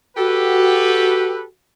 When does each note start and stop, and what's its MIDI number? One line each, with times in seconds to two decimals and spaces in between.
0.17 1.47 66
0.17 1.43 67
0.17 1.43 69
0.17 1.43 71